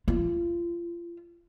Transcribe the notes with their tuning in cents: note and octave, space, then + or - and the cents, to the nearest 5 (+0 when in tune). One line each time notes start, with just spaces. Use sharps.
F4 -30